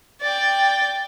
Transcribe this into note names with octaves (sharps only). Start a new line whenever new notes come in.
D5 G5